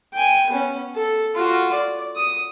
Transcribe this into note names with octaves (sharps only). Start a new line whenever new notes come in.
G5 G#5
B3 C#4
A4
F4 F#4
D5
D#6